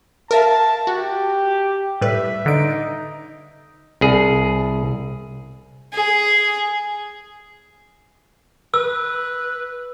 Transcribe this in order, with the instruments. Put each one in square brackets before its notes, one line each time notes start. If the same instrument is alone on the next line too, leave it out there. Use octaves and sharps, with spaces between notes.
[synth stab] A#4 E5 F5 [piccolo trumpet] A5
[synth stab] F#4 [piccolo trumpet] G4
[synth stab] A2 G3 B4 [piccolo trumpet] E5
[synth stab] D3 D7 [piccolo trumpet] D#4
[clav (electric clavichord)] C2 G#4
[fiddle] G#4
[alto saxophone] B4 [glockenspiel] E6